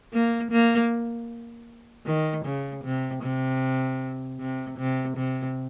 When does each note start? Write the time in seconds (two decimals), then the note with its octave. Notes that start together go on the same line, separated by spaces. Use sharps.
0.13 A#3
0.51 A#3
2.06 D#3
2.45 C#3
2.84 C3
3.23 C3
4.40 C3
4.78 C3
5.17 C3